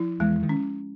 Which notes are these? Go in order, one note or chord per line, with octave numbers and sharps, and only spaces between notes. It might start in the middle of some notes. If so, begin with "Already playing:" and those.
Already playing: F3 E4
E2 E3 G#3
D#3
C#4